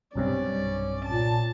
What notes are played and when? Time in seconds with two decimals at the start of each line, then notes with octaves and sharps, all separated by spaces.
0.16 B1 G2 C3 G3 C#4 D5
1.05 A#2 A5